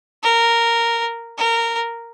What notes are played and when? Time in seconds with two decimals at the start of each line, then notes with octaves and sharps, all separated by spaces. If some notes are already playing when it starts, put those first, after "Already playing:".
0.23 A#4
1.38 A#4